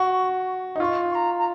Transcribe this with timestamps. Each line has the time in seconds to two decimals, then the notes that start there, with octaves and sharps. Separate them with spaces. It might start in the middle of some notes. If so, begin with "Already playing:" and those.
Already playing: F#4 C#6
0.76 D#4
0.80 F4 C#6
1.10 C#6
1.15 A#5
1.39 A#5